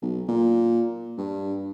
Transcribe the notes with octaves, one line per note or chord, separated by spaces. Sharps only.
B1
A#2
G2